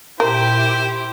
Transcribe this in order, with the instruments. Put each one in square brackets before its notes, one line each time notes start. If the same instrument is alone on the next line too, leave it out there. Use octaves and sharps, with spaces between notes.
[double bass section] A#2 [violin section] E4 G4 [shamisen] A#4 [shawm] C5